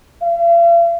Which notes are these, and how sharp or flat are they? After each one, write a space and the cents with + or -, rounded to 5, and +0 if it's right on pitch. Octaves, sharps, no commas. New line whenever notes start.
F5 -45